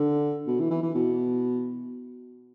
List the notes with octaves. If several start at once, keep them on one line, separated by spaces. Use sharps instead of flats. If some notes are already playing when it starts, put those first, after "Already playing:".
Already playing: D3
B2
E3
E3
E3
B2